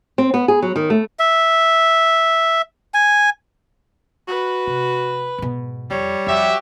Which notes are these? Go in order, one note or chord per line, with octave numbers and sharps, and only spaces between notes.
C4
B3
G#4
F#3
D#3
A3
E5
G#5
F#4 B4
C3
G#2 B2
F2 G3 C#5
F2 F#4 G4 E5